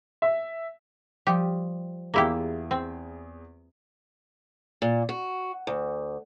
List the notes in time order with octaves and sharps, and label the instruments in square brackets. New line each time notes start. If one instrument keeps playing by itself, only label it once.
[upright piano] E5
[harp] F3 G3 D#6 [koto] G4
[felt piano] E2 G#4 [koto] A#3 E4 G4 [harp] F4 E5
[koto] C4
[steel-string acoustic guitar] A#2
F#4
D2